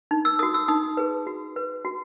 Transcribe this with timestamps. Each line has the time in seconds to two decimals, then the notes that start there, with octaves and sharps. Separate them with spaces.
0.11 D#4
0.25 E6
0.39 F#4 A4 D#6
0.54 E6
0.68 D#4 D#6
0.97 G#4 B4
1.27 F#4
1.56 B4
1.85 F#4